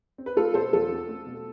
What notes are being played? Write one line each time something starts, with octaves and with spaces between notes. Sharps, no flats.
C4
B4
A3 F4 A4
B2 A4 C5
E2 F4 A4
C4
A3
B2